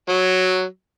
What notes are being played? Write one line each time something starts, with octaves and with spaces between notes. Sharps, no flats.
F#3